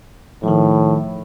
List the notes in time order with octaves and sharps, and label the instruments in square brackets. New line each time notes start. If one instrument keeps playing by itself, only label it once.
[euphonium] A2 [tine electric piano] D#3 F3